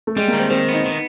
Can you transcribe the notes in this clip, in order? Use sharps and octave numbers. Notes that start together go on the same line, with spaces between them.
A3
G3 G#3
A#3
D#3
C4
D#3 C4
B3
D#4
D#3